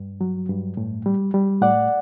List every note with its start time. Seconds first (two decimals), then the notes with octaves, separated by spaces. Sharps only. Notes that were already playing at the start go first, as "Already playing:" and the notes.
Already playing: G2
0.21 F#3
0.49 G2
0.77 A2
1.06 G3
1.34 G3
1.62 A2 D5 F#5